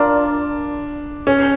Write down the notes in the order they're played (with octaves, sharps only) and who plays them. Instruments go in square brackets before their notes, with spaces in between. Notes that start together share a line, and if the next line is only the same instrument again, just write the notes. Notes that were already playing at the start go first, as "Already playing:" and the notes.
Already playing: [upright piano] D4 [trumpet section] F4 A#4 D5
[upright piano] C#4